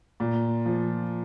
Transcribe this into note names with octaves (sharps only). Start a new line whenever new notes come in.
A#2
F3